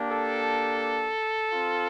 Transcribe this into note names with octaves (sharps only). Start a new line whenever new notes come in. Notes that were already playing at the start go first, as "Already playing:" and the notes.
Already playing: A#3 D4 G4
A4
C4 F4